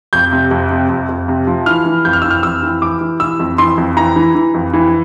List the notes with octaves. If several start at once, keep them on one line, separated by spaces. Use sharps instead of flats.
F2 G6
C3
F2
C3
F2
F2
C3
F3
E3 F6
E3
F2 G6
F6
E3 E6
F6
F2 E6
E3
E3 D6
E3
E3 E6
F2
E3 C6
F2
E3 A#5
E3
E3
F2
E3